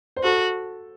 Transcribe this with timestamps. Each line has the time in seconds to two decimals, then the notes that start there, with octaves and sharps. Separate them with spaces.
0.16 C5
0.23 F#4 A4